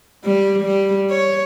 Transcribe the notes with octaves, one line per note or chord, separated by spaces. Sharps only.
G3
G3
C#5